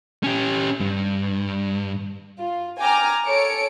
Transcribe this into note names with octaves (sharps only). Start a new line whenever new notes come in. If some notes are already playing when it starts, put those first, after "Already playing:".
C#4 G4
G2
F4
G5 G#5 A#5 D6 F6
A4 C#5 C#7 D7